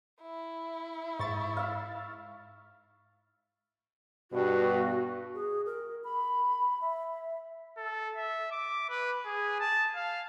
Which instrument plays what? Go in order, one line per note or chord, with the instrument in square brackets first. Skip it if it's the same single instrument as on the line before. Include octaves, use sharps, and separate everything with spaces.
[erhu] E4
[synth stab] G#2 A6 [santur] C#6
[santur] E5 F5
[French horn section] G2 B2 [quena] F#4
[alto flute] G#4
A#4
B5
E5
[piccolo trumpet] A4
E5
D6
B4
G#4
A5
F5